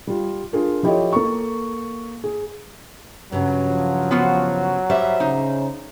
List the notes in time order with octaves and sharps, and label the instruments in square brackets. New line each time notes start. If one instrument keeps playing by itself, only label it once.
[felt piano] G3 F4
D4 F4 G#4 A#4
F3 E4 G4 A4 C#5 D#5
A#3 A4 C#6
G#4
[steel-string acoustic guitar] G2 C#3 [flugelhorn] F#3
[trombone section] F3
[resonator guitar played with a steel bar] B3 F4 F#4
[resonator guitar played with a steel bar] G3 [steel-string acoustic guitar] C5 E5
[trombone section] C#3 [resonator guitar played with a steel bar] D#4